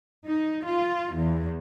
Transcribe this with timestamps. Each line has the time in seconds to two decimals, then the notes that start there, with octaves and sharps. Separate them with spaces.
0.24 D#4
0.65 F4
1.14 E2